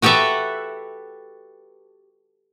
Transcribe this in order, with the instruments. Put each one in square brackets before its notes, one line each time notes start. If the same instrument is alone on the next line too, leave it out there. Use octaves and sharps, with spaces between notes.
[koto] F#4 G4 A4 B4 E5